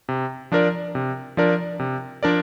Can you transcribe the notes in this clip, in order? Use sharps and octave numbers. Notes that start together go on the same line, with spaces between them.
C3
F3 D4 A#4 D5
C3
F3 D4 A#4 D5
C3
F3 D4 A#4 D5